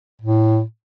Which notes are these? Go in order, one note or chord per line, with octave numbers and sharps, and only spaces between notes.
A2